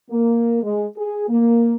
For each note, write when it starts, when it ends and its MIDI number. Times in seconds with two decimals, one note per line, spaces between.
0.11 0.61 58
0.63 0.85 56
0.97 1.28 68
1.29 1.76 58